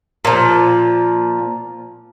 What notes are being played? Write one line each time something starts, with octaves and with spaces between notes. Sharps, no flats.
A#2 F3